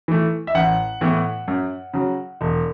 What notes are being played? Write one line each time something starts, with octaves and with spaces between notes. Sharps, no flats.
E3 A3
E5
A1 F#5
A2 E3 B3
F#2
C#3 F#3
E1